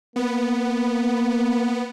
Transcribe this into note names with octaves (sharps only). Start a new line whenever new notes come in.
A#3 B3